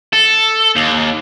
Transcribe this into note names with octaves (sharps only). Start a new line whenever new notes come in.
A4
D#2